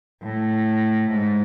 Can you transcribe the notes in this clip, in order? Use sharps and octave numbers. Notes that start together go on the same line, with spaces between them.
A2
G#2